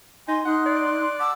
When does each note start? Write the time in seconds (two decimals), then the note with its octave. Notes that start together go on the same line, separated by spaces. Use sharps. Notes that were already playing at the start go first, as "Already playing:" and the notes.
0.28 D#4 G#5 C6
0.45 D#4 F#5 C6 F#6
0.66 D5
1.19 F#5 A5 D6 E6